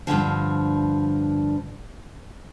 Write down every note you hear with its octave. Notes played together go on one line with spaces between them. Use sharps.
G2 A#2 D3 F3